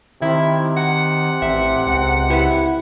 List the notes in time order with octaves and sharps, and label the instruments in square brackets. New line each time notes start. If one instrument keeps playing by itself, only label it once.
[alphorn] C3 [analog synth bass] D#3 [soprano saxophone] E4
[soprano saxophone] F#5
[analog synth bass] A1 [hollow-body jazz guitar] E5
[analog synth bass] C#2
[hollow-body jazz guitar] E4 G4 B4